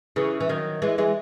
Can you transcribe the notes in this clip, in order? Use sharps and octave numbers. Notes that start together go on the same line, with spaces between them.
C#3 E3
E3
D#3 F#3
E3 G#3
E3 G#3